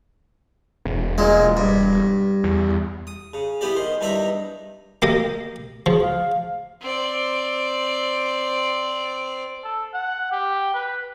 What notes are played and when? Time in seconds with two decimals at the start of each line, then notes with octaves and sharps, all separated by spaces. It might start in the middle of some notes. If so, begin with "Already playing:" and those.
0.85 E1
1.18 A#2 G#3
1.57 G2
2.44 E2
3.07 D#6
3.34 C#3
3.61 E3 B3 G4 D5
3.76 D#3 C5
4.01 E2 G2 D#4 D5 E5 A#5
5.02 A#3 G4 D#5
5.86 F3 G#4
6.01 F5
6.81 C4 D5
9.64 A4
9.94 F#5
10.31 G4
10.74 B4